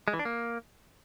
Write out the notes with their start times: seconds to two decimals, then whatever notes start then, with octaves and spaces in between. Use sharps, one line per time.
0.08 G#3
0.13 E3
0.19 D4
0.25 A#3